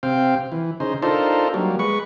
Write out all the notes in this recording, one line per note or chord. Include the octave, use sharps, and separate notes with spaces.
C3 C4 F5 G5
E3
C#3 D#4 C5
D4 D#4 F4 A4 A#4 C5
F#3 G3 A#3
G#3 B4 C#6